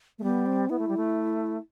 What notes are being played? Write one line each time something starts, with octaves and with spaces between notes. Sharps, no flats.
A3
G3 B3
C4
B3 E4
A3
G3
A3